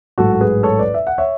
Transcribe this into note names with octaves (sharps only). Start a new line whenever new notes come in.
A1 G#2 F#3 F#4 A4
A4
G#4 B4
A4 C#5
B4 D5
E5
F#5
C#5 E5